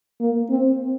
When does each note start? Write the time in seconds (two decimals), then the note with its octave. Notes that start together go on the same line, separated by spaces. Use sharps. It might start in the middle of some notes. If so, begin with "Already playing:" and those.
0.20 A#3
0.50 C4